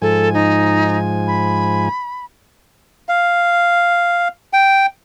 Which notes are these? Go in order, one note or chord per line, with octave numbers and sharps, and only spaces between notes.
G#2 F3 A4 G#5
D#4
B5
F5
G5